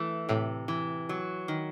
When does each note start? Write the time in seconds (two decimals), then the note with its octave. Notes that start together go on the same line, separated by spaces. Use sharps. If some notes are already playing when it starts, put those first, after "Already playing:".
Already playing: E3 A3
0.29 A2 C3
0.68 E3
1.09 F#3
1.48 D#3